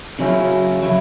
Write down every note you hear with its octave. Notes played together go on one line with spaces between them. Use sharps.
C#3 F#3 C#4 E4
F#3 E4